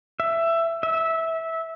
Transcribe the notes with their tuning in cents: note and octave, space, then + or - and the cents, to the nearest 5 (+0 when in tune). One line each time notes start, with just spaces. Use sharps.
E5 +15
E5 -15